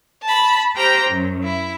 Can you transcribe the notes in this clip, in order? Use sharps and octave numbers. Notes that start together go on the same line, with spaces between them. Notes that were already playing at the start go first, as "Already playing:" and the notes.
A5 B5
G4 C5 G5 A#5 F6
F#2
E4